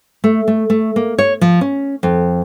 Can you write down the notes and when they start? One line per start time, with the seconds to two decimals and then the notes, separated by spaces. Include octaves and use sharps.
0.24 A3
0.48 A3
0.70 A3
0.96 A#3
1.18 C#5
1.41 F3
1.61 C#4
2.03 F2